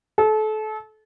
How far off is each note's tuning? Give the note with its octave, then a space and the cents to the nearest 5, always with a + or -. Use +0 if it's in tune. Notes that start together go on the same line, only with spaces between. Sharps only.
A4 -30